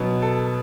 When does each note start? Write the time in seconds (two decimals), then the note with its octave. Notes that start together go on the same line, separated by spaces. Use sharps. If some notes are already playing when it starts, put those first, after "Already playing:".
Already playing: B2 F#3 B3
0.22 A4